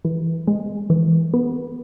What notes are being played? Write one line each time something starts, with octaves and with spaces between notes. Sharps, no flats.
E3
G#3
E3
B3